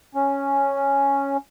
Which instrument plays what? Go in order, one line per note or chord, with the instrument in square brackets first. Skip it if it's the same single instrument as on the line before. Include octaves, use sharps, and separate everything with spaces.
[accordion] C#4